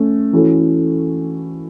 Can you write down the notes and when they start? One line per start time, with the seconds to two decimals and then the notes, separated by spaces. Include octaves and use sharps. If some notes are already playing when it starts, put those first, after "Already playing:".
Already playing: A3 C#4
0.33 E3 C#4 F#4 A4